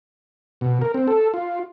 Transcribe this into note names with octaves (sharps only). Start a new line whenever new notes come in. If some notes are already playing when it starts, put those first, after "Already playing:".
B2
A#4
C4
A4
F4